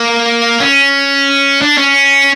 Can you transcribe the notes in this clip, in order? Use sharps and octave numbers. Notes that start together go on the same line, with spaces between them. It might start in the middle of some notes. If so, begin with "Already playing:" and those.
Already playing: A#3
C#4
D4
C#4